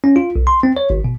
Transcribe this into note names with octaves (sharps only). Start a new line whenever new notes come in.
C#4
F4
B1
C6
C4
C#5
G#1
B2